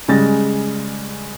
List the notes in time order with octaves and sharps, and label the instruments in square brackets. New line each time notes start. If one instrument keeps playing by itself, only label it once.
[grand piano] C#3 G3 G#3 A6 A#6